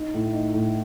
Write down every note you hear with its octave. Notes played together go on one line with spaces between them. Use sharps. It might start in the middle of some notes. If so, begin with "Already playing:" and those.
Already playing: D#4
A2
D#4
A2